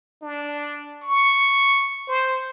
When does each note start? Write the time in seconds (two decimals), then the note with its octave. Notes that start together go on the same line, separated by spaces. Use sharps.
0.22 D4
1.02 C#6
2.08 C5